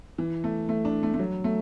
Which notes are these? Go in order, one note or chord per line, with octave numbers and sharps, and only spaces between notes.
E3
A3
A3
D4
A3
A3
F#3
A3